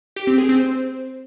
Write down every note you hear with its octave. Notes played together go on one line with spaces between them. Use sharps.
G4
C4
G#4
C4
C5